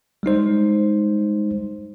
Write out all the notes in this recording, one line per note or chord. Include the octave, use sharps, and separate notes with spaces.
G3 G#3 D#4 C5